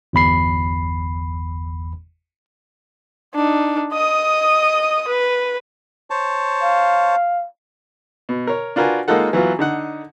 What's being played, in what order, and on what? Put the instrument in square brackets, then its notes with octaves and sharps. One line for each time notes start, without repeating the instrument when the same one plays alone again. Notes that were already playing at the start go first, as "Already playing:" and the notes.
[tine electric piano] G1 E2 B5 C7
[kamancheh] D4 D#4
D#5 D#6
B4
[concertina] C5 C#5 A5
[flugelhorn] F5
[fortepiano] B2
A#4 C#5
D4 F4 F#4 A#4 B4 G#5
G#3 A#3 D#4 F4 A4 F#5
E3 F#3 B3 F4
D3 D#4 F#5